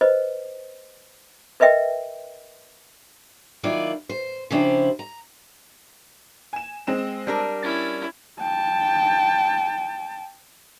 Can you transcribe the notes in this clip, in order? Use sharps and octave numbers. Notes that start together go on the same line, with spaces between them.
B4 C5 D#5
A#4 B4 D#5 E5 G5
D#3 F#3 A#3 E4 F4 D5
C5
C#3 F3 D4 E4 G4 C5
A#5
G#5 E7
G#3 C4 E7
G3 D4 A#4
C#4 E4 A6
G5 A5